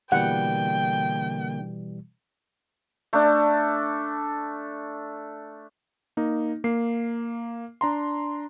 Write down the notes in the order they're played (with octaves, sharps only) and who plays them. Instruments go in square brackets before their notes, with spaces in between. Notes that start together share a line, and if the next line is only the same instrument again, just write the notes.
[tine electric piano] B2 E3 G3 [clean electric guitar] D3 A#3 [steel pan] F#5 [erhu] G5
[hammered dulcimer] A3 D4
[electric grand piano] A#3 D#4
A#3 C7
D4 A#5 C6